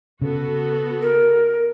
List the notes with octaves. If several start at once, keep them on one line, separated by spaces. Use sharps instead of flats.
C#3 B3 F#4 A4
A#4